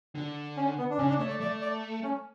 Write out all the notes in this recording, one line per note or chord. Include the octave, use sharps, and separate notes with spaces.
D3
C#4
B3
D4
C#3 C#4
D4
A3 C#5
D5
A3 D5
D5
C#4